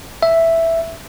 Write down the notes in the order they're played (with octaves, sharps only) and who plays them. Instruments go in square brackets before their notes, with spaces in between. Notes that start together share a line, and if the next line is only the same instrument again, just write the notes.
[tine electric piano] E5